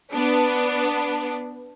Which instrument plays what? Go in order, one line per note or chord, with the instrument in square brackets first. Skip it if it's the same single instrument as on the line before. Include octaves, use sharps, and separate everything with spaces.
[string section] B3 D4